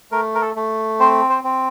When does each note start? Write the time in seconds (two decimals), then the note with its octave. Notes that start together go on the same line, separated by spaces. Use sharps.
0.12 A3 A#4
0.35 A#4
0.41 A4
0.56 A3
1.00 C4 C5
1.30 C5
1.44 C4